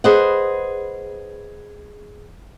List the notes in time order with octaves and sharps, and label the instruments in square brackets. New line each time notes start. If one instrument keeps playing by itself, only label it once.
[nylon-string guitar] G#4 B4 C5 D#5 F#5